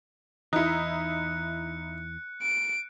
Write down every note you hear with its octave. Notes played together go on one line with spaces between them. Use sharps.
E2 E3 D#4 E4 F#6 C#7
D7